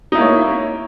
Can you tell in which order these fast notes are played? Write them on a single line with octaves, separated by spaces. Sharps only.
D#4 E4 A#3 C#5